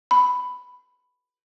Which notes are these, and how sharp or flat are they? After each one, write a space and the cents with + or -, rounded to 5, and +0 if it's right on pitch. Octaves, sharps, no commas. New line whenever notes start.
B5 +10